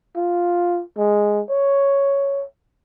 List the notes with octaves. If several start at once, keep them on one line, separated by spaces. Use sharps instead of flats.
F4
G#3
C#5